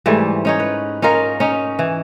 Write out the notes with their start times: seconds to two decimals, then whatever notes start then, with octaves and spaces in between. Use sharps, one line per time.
0.06 G#2 E3 G3 A3
0.45 C#4 D#4 C#5
0.60 B4
1.02 C#4 D#4 F4 A#4
1.40 C#4 D#4
1.79 E3